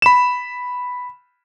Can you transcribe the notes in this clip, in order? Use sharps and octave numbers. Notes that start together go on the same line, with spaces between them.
B5 E7